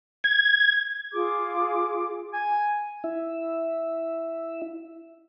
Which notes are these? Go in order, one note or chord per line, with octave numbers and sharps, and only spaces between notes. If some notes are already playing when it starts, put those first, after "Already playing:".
G#6
F4 G#4 D6
G#5
E4 E5